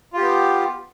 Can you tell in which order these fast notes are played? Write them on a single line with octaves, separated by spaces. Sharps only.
F4 G4 B3